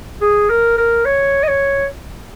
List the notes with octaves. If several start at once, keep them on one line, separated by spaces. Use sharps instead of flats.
G#4
A#4
A#4
C#5
D#5
C#5